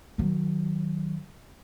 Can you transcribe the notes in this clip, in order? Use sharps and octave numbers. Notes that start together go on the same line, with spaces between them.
D#3 F#3